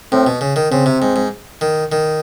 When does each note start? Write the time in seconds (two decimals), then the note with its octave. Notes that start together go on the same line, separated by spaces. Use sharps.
0.12 A2 C4
0.27 B2
0.41 C#3
0.56 D#3
0.71 C#3 C4
0.86 C3
1.02 G#2
1.16 G#2
1.61 D#3
1.92 D#3